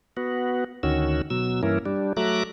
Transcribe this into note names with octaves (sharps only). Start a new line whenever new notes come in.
B3 F#4
D2 D#3 C#4 F#4 E6
B2 F#3 E6
G2 E3 A#3 C#4 E4 A#4
G3 D4
F#3 A3 E5 A#5 D6 F#6